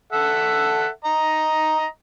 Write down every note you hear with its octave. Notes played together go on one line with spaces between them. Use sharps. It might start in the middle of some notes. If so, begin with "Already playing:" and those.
A4 E5 F#5
D#5 A#5